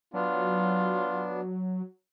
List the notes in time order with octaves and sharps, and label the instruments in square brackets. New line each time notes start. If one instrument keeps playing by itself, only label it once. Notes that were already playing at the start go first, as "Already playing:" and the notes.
[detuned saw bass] F#3 [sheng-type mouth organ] B3 D4 [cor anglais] F4